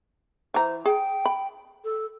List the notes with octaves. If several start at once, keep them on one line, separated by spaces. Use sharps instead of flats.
E3 C5 A#5
G#4 G5
B5
A4